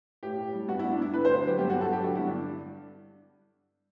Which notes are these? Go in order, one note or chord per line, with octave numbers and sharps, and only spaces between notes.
A2 G4
A2
G3
G2 F#4
E4
G2
D4
G2 E4
D3 B4
C5
D2
F#3 G4
G2 G4
F#4
G2
A4
F#3 G4
D3 F#4
E4
G2
D4